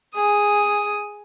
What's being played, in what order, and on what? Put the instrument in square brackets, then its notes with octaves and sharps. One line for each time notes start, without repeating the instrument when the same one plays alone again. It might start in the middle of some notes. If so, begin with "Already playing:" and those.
[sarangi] G#4 [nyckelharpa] D#6